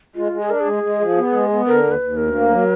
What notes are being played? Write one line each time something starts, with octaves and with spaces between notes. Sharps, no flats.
G#3 F4
G#3
G#4
D4 A#4
G#4
G#3
G#3
F3
B3
G#3
B3
D3 A#4
D#2
B4
D#2
D2 A#4
A#3
F#3